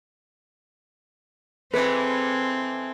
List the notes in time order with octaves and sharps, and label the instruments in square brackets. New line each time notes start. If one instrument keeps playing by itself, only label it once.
[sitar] E3 G#3 A3 [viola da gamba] C4 [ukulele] B4